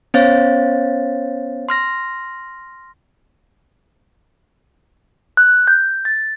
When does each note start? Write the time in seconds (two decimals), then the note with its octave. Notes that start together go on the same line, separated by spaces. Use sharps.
0.14 B3 C#4 C5 C#5 F5 A6
1.69 C6 F6 A#6
5.37 F#6
5.68 G6
6.05 A6